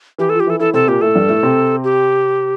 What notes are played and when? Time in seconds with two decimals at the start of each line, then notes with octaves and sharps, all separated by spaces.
0.18 E3 E4 G4
0.29 F3 F4 A4
0.40 G4
0.47 E3 E4 A4
0.60 E3 E4 A4
0.74 C3 C4 A4
0.87 A#2 A#3 G4
1.01 A2 A3 A4
1.15 G2 G3
1.29 A2 A3
1.43 C3 C4
1.84 G4